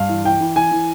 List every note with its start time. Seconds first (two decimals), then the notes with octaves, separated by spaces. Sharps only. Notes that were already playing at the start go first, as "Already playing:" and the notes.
Already playing: G2 F5
0.09 E3
0.25 E3 G5
0.41 E3
0.56 E3 G#5
0.71 E3